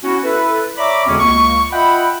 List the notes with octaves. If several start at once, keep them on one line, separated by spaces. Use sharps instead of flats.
B3 C#4 E4 F#4
E4 A4 B4
C#5 D5 E5 A#5 B5 D6
E2 B2 D3 G#3 C4 C#4
C#2 A#3 C#6
F4 D#5 E5 F#5 G5 B5